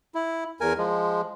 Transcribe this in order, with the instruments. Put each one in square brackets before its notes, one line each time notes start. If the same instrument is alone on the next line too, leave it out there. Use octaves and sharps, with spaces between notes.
[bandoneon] E4
E2 A#4 G#5
F3 G#3